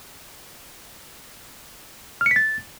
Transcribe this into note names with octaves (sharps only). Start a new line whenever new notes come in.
F6
C#7
B6
A6